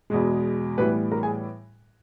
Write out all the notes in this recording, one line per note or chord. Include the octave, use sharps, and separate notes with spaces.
E2 B2 G#3
A2 E3 G3 B3 B4 B5
A#4 A#5
G#4 G#5